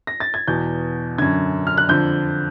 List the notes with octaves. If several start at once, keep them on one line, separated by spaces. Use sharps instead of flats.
A#6
A6
G#6
E2 B2 G6
F#2 D3 G#6
F6
F#6
F2 D3 G6